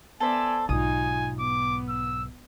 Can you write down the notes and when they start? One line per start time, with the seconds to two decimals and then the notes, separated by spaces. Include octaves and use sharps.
0.20 B3 A4 C5 D5 E5 G#5
0.69 B1 G#2 D#4 F4 G#5 D#6
1.39 B3 D6
1.89 E6